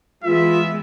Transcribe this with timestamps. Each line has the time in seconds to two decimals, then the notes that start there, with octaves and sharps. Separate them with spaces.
0.24 E3 G#3 B3 F4 E5